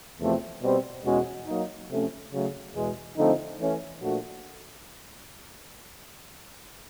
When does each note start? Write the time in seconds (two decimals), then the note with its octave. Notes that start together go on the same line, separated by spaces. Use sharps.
0.19 E2 C3 F3 A3 C4
0.61 B2 G3 C4
1.04 E2 B2 G#3 C#4 F#4
1.47 F#3 A#3 D#4
1.89 C3 F3 A3 C#4
2.32 C#3 F#3 A3
2.74 E2 B2 G#3
3.17 D3 F3 A3 C4 D#4
3.60 E3 A3 C#4
4.02 A#2 F3 A3 D4 F#4